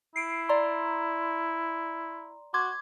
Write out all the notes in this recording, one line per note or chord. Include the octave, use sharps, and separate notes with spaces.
E4 C7 D7
D5 A#5 C6
F#4 C6 D6 G#6